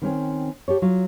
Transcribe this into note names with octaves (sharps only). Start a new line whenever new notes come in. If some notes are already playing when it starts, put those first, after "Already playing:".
D#3 C4 C#4 C5
G4 A4 C#5
F#3 F4